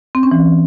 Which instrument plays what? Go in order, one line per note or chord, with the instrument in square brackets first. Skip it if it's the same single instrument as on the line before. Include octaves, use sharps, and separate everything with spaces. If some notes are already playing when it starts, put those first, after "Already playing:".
[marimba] C4
C#4
E3